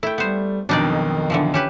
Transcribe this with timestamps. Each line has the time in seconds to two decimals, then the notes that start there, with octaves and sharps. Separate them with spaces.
0.03 A3 E4 G5
0.18 G3 B3 C5
0.69 B1 F2 B2 D#3 D4 D#4 D5
1.30 D3 E3 F3
1.54 C#4 G4 B4 E7